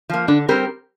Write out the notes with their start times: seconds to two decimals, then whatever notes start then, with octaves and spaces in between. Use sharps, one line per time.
0.09 F3 A#3
0.28 D3 D4
0.48 G3 C4 G4 A#4